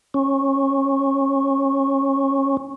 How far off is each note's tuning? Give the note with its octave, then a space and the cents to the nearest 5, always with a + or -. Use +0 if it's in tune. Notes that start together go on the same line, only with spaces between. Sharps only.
C#4 -20